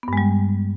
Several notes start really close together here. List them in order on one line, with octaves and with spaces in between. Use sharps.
B3 G2 G#3 G3